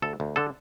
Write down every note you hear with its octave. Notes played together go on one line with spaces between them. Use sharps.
D2 A4
D2
D3 A4